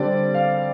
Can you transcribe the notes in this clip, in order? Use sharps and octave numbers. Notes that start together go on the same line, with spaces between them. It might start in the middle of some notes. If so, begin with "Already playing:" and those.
Already playing: D3 G3 C4 D5
F5